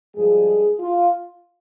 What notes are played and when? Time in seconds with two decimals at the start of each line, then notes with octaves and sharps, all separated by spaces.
0.16 G2 F3 G#3 G#4
0.80 F4